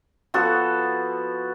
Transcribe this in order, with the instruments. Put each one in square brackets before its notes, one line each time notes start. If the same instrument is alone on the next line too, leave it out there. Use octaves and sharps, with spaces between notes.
[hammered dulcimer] F3 B3 F#4 A4